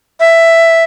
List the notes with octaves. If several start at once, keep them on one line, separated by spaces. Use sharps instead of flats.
E5